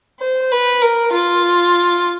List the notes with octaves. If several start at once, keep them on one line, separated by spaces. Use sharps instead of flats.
C5
B4
A#4
F4